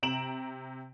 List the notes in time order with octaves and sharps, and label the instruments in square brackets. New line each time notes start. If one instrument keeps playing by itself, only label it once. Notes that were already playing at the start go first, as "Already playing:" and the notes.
[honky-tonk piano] C3 A#5 D7 E7 F#7